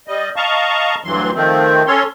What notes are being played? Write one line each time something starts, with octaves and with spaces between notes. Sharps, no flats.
G3 D#5
D#5 F5 A5 A#5 C#6
D2 G2 E3 F#3 C6
D#3 F3 A3 C4
C#4 A4 C#5 C6